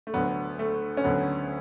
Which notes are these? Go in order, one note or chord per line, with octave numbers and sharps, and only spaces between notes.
A3
D2 D3 F#3 B3
A3
C#4
D2 D3 F#3 B3